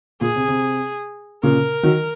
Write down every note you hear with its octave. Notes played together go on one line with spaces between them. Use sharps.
A#2 G#4
C3
C3
A#2 C#3 A#4
D#3 F#3